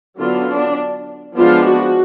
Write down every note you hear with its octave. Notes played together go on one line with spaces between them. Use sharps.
D3 F#3 B3 D4 F4
D4
F3 G#3 B3 D4 F4
F#4